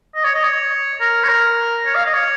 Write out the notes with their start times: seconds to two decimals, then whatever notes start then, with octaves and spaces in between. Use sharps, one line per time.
0.15 D#5
0.24 C#5
0.34 D#5
0.44 C#5
1.00 A#4
1.24 C#5
1.29 A#4
1.86 C#5
1.95 F5
2.05 D#5
2.14 C#5